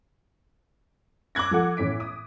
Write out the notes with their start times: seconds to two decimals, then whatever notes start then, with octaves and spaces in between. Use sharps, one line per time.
1.35 D6 E6 F#6 G#6 A#6
1.51 F3 A4 F#5
1.77 A2 E3 C#4 B6 D7
2.00 D#6